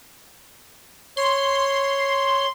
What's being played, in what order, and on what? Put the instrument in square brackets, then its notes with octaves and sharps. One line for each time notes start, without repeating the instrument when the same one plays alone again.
[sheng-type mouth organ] C#5 [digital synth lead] C6